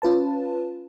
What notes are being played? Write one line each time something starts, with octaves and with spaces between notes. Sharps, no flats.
C#4 F4 B4 A5